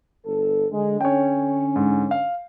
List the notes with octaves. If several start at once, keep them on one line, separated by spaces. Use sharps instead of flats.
G1 A4
D3 G#3
D3 C#4 C#5 G5
G#2
F5